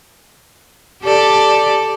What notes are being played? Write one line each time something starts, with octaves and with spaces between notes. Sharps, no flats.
G4 A4 D5